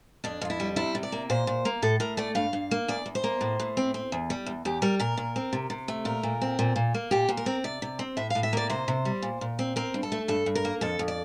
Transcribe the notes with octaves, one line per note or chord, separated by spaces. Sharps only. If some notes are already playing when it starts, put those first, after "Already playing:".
F2 D4
F2 F4
E4
G3
C3 E4
C3
D5
A#3
A#2 C5
A#2
A#3
A2 A4
A2 A#4
A3 D5
G2 F5
G2
A#3
E2 D5
E2
C5
A#3
A2
A2
C4
C4
E2
G3
E2
E2 G4
G3 A#4
A#2 A#4
A#2
C4
C3
C3
A3
A#2 A#4
A#2
C4
A#2
A#2
A#3
A#2 G4
A#2
A#4
C4
C3 D5
C3
C4
A2 E5
F5
A2
E5
A#3 D5
C3 C5
C3
G3
A#2
A#2
C4
C4 A#4
G2
A4
A3
G2 A4
G2
A#4
A#3
F2 A4
F2
D5